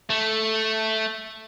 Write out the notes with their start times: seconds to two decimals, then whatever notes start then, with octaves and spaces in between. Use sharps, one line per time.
0.10 A3